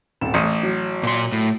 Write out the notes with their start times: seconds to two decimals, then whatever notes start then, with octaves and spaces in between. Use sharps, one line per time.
0.21 D#1 G#1 E7
0.34 A1 D#6 C#7 D#7
0.63 F#3
1.03 A#2 C6
1.32 A2